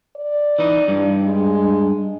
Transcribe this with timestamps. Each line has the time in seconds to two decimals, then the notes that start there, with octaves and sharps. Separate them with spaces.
0.16 D5
0.59 E3 D#4
0.88 G2
1.24 G#3